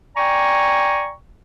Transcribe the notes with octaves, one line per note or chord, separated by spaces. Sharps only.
D5 G5 G#5 A#5 C#6